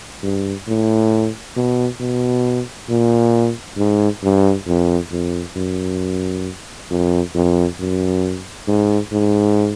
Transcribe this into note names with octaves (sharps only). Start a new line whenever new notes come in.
G2
A2
B2
B2
A#2
G#2
G2
F2
F2
F#2
F2
F2
F#2
G#2
G#2